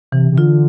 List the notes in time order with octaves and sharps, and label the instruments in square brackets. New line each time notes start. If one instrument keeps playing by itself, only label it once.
[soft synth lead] C3 [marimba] E3
[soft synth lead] C3
[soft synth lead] D3 [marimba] F4